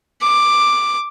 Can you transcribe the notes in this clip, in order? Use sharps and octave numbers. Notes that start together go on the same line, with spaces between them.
D6